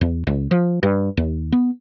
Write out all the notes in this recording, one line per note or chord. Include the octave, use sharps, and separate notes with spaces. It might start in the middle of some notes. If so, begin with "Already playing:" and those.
E2
C#2
F3
G2
D#2
B3